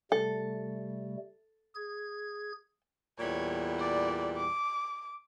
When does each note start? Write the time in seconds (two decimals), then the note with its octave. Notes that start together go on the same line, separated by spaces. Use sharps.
0.12 C3 G3 A3 A4
1.75 G#4 G#6
3.19 E2 A#2 G3 C#5
3.79 D5
4.37 D6